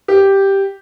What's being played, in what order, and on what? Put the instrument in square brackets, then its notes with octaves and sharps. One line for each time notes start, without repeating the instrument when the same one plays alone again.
[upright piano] G4